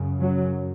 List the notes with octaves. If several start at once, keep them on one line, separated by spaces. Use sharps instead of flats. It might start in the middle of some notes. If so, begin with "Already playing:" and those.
Already playing: F#2 C#3
F#3